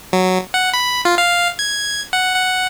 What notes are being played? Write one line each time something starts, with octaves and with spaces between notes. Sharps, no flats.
F#3
F#5
B5
F4
F5
G#6
F#5
F#5